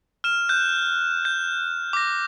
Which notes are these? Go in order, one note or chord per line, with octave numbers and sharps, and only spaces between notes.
F6 E7
F#6 G6
G6
D6 A#6